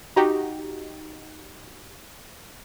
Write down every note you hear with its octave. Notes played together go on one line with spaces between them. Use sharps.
D#4 F#4 G4